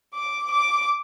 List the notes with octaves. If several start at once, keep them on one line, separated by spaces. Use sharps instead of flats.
D6
D6